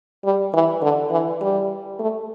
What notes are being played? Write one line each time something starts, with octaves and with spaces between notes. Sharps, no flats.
G3
E3
D3
E3
G3
A3